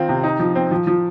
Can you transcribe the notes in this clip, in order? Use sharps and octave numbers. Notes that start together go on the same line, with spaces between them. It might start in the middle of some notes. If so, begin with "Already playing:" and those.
Already playing: D#3 C4 F4
C3
D#4
F3
C4
F3
F3